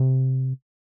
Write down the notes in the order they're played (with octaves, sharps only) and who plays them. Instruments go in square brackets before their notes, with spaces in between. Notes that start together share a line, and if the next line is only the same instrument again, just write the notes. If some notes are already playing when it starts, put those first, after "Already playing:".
Already playing: [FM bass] C3